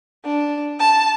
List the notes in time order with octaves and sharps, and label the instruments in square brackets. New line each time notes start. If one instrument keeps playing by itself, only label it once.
[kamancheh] D4
A5